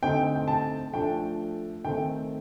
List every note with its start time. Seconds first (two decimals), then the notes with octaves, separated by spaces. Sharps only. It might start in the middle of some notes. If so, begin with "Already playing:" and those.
0.03 D3 A3 C4 D#4 G5
0.36 G5
0.48 A5
0.93 F3 A3 D4 G5
1.85 D#3 A3 C4 G5